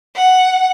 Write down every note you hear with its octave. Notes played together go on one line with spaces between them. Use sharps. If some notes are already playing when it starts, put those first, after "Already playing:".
F#5